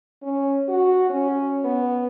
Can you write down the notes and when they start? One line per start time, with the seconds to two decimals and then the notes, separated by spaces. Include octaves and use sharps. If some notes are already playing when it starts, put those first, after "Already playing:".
0.22 C#4
0.68 F#4
1.09 C#4
1.64 B3